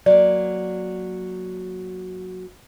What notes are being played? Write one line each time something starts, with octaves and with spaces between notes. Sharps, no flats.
F#3 A#3 D5